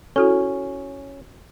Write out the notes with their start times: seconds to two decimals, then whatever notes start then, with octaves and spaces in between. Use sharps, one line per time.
0.16 C#4 E4 F#4 A4